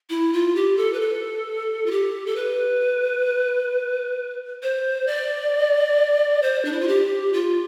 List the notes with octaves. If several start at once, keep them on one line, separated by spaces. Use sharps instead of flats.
E4
F4
G4
A4
B4
A4
F4
G4
A4
B4
C5
D5
C5
D4
E4
F4
G4
F4